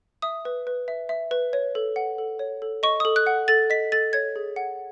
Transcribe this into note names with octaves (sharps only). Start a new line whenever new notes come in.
E5 D#6
B4
B4
E5
E5
B4
C#5
A4
F#5
A4
C#5
A4
D#5 C#6
A4 D#6
F#6
F#5
A4 A6
D#5 B6
A4 A6
C#5 G#6
G#4
F#5